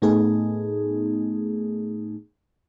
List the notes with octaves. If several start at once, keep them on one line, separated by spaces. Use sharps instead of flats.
A2 A3 B3 D#4 G#4